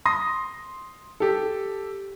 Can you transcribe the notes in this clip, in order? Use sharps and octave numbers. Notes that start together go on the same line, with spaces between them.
C6 D#6 A#6
G4 A4